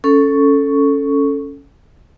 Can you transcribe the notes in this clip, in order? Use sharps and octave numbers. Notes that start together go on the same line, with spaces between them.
C#4 A4 C#6